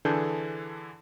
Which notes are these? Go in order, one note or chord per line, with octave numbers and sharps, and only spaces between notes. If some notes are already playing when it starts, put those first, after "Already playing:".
D3 E3 D4 G#4 A4 G6